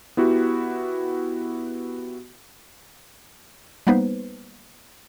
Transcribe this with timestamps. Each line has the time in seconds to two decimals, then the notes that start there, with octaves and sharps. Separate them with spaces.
0.17 B3 E4 F#4 G4
3.87 G3 A#3 B3 D#4 B4 C5